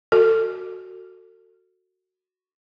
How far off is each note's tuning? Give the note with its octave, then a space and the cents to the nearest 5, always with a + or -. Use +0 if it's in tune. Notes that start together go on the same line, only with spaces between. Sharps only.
F#4 +0 A4 +30